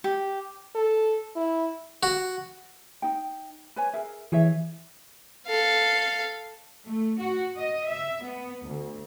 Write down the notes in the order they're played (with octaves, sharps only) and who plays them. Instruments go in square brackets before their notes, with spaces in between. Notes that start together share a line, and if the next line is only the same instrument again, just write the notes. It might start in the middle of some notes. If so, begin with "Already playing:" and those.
[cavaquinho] G4
[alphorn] A4
E4
[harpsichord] F#4
[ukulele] D#4 G5
B4 C#5 G#5
G#4 A#4 E5
[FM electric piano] E3 [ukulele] G#4 C#5 E5
[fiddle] A4 F5
[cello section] A3
F#4
D#5
E5
B3
D2